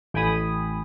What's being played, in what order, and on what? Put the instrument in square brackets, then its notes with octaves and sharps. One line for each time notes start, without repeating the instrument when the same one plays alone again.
[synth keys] A1 G5 G#5 B5 D#6